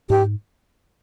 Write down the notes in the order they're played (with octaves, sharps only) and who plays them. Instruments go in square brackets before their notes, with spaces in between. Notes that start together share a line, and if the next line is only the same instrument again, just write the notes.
[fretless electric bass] G#2 [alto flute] G4